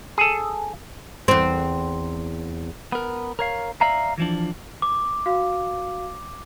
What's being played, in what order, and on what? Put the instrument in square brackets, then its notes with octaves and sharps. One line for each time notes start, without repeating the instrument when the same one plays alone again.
[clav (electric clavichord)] G#4 A4
[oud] E2 C4
[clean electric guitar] B3 A#4
A#4 C#5 F5
D5 E5 F5 A#5
E3 F3 D4
[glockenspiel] D6
[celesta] F#4 F5